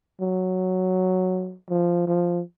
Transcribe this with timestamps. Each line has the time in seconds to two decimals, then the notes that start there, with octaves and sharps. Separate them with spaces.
0.21 F#3
1.70 F3
2.07 F3